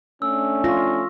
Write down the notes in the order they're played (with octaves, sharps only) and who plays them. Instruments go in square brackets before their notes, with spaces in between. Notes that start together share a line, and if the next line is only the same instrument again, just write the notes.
[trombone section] A3 C#4 D4 [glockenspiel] E6
[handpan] F4 [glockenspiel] C#6 A#6